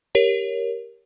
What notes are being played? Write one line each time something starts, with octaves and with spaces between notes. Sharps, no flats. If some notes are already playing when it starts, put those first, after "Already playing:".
G4 A#4 C#5